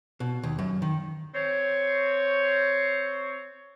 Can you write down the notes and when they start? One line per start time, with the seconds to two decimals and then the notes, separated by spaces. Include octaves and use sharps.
0.20 B2
0.43 D#2
0.59 F#2
0.82 D#3
1.35 C4 C5 C#5